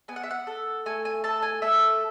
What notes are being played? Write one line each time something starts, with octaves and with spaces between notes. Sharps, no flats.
B3 G#5
F#5
E5
F#5
A4
A3 G#5
G#5
A4 A5
G#5
A3 E5